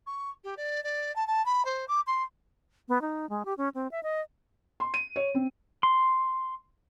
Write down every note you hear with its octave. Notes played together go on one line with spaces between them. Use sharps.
C#6
G4
D5
D5
A5
A5
B5
C5
D6
C6
B3
D#4
G#3
G4
C#4
C4
E5
D#5
C6
D#7
C#5
C4
C6